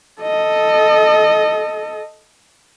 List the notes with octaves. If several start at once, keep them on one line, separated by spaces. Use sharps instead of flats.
A4 D#5